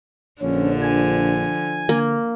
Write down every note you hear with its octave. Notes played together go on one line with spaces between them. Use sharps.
A#1 D3 F3 C#4
G#5
D3 A#3